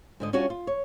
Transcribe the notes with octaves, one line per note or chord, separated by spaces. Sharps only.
G#2 D3 D#5
G3 C#4 D4 F4 F#4 C#5
F4
C#5